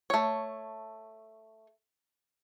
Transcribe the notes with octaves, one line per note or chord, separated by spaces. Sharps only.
A3 C#5